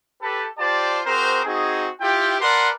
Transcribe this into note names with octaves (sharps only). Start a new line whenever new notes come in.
G4 A4 B4
F4 G4 C5 D5 A5
C4 F#4 G#4 A#4 C5
C4 D#4 F#4 G#4
E4 F4 G4 G5
A#4 B4 D5 F#5 A5 C6